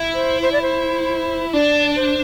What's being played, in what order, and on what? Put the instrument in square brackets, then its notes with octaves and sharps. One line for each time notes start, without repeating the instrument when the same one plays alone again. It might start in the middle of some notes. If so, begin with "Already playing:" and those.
Already playing: [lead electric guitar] E4
[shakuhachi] C5
C5
D5
C5
[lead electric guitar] D4 [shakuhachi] D5
[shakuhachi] C5